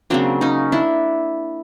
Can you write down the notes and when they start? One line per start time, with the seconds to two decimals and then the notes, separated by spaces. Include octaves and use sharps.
0.10 C#3 F#3 A#3 C4 D4
0.41 C#4 D#4
0.72 D4 E4